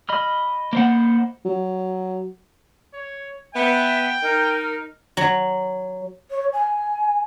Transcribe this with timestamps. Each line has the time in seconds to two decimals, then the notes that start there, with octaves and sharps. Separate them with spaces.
0.09 D#5 B5 F6
0.73 A#3 C5 F#5
1.45 F#3
2.93 C#5
3.54 B3 E5 G5
4.22 D#4 A#4
5.17 F#3
6.30 C#5
6.53 G#5